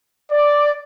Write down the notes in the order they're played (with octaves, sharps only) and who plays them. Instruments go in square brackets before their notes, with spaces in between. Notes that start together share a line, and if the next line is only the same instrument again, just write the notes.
[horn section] D5